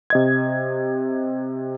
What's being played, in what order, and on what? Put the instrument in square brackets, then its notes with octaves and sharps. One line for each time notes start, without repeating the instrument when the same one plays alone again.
[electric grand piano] C3 D#5 G#6